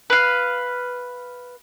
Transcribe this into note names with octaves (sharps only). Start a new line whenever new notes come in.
B4 F5